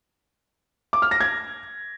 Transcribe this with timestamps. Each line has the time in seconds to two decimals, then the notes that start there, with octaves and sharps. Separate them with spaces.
0.93 D6
1.02 F6
1.11 A#6
1.20 G#6